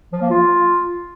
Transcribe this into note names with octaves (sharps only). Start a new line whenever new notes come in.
F3
A#3
F4